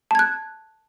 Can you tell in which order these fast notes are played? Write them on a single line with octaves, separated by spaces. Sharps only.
A5 G#6 F#6